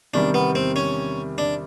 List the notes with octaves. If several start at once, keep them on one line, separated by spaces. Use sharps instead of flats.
E2 C3 D#3 G3 D4
B3
C4
C#4
D4